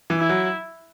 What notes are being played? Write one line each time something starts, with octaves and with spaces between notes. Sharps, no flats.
E3
E4
F#3